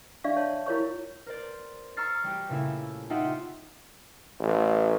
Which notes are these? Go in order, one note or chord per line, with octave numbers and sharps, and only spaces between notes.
D4 D5 E5 F5 C#6
C#5 A5 C6
E4 F4 A#4 C#5 B5 C#6
A#4 C5 D5
A#5 C#6 E6 F6 A6 C7
G3 G4
A#2 C#3 A3 E4
D#4 F4 G4 E5 F#5
A1